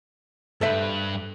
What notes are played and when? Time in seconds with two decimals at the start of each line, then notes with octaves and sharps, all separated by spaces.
0.61 G2 A4 B4 C5 E5